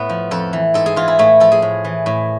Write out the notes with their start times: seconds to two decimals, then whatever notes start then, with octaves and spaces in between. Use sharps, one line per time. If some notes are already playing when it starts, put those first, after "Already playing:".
Already playing: A2 B3
0.09 F3
0.31 F2 A4
0.53 E3
0.74 G#2 A4
0.86 G#4
0.96 E3 F4
1.08 E4
1.19 A2 A3
1.40 F3 A4
1.52 G#4
1.62 A2
1.84 E3
2.06 A2